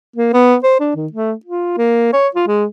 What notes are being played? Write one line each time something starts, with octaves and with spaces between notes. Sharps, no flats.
A#3
B3
C5
D4
D#3
A3
F4
A#3
C#5
F4
G#3